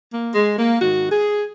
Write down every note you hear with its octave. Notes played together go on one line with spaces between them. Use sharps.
A#3
G#3
A#3
G#2 D#3 F#4
G#4